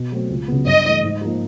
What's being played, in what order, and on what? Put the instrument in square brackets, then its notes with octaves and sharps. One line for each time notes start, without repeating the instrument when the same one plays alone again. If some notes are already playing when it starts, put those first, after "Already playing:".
Already playing: [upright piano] B2
F#3 A3 C4
C#2
C#3 F#3 B3
[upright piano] G2 [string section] D#5
[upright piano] E3 A3
G#2
F3 A#3 D#4